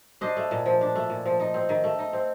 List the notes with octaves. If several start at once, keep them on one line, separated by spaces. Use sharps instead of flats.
D4 C5 D#5
A3
A#2
F3
D4
A3
A#2
F3
D#4
C4
D#3
A3
D#4
C4